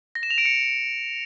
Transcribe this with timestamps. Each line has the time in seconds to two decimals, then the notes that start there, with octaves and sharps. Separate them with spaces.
0.15 A#6
0.23 E7
0.30 F7
0.38 D7
0.45 C#7